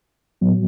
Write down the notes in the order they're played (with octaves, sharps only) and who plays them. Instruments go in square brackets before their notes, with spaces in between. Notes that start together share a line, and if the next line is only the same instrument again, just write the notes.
[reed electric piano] A2 F#3 B3